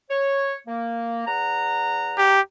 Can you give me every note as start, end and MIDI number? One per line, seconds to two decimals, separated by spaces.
0.10 0.54 73
0.68 1.25 58
1.27 2.37 40
1.27 2.37 78
1.27 2.37 82
2.18 2.41 67